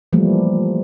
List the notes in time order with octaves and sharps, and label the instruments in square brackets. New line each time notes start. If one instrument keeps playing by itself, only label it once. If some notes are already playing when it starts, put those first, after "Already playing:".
[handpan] E3 F3 G3 A3 A#3